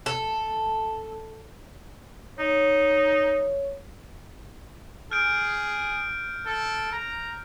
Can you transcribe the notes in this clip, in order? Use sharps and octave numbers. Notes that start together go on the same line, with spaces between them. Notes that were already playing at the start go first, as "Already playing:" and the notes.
A4
D#4 C#5
G#4 F6 G6 D7
A4
A#5